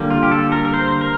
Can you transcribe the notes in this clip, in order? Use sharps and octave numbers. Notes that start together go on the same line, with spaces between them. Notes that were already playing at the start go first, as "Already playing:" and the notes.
Already playing: D3 G3 A#3
F4
G4
A4
A#4
A#4
C5
A#4